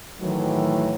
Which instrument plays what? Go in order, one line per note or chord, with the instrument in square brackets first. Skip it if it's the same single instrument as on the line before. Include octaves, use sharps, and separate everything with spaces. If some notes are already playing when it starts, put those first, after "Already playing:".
[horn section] A2 D#3 E3 F#3